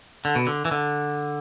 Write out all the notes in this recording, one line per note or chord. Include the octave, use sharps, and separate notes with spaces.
D3
B2
D3
E3
D3